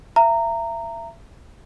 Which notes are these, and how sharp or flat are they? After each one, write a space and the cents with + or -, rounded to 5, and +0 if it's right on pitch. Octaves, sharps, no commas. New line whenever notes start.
E5 +30 A#5 -15